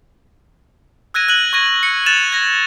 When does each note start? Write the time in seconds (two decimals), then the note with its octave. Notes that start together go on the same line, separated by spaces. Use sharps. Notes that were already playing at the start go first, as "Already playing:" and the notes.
1.14 E6 F#6 G#6 A#6 D#7
1.28 F#6 D#7 F#7
1.53 C#6 F#6 G#6 A#6 D#7
1.83 C#7
2.06 F#6 A6 E7 F7
2.32 G#6 A#6